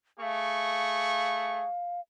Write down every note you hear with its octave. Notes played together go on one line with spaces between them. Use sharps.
A3 G#4 F5 C#6